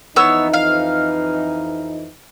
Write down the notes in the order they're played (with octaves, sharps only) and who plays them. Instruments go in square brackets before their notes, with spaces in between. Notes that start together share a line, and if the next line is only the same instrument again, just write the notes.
[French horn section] F2 E3 D#4 [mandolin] B3 C#5 E6
[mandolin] F5